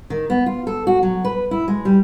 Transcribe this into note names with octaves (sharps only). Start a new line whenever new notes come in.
D#3
B3
F4
A4
F#4
F#3
B4
E4
G#3
G3